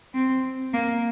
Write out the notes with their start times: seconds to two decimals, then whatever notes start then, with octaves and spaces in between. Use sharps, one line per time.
0.14 C4
0.73 A#3